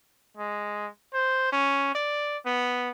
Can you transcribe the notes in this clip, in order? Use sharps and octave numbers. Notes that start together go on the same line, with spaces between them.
G#3
C5
C#4
D5
B3